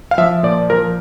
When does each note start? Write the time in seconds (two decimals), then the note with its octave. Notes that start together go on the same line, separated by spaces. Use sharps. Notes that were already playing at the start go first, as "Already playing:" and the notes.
0.11 F5
0.18 F3 E5
0.43 A#2 D5
0.70 F3 A#4